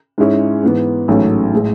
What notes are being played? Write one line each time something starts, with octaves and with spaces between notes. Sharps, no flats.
G#2 G#3 C#4 E4
G#2 E3 B3
A1 G#2 F#3 A3 C#4
A2 G#3